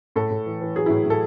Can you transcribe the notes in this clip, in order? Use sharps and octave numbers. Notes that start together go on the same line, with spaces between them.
A2 A4
A2
E3
E3
F#3 G#4
A2 E4
A2 A4